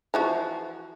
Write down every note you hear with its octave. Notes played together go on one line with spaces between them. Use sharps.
E3 F3 F#4